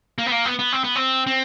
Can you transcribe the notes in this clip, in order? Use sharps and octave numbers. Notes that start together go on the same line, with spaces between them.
A#3
B3
A#3
B3
B3
C4
B3
C4
C4